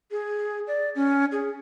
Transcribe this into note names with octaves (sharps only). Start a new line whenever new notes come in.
G#4
D5
C#4
G#4